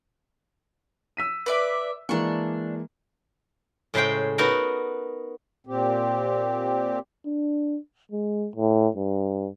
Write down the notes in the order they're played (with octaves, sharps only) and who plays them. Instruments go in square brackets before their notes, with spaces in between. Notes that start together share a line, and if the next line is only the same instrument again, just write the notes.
[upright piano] E6 B6 D#7
[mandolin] B4 D5 E5
[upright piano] E3 G#3 A#3 [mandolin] D4 C#6
[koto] A2 C#3 G#3 C5 G5
B3 D#4 F#4 A#4
[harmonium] A#2 C4 G4
[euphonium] D4
G#3
A2
G2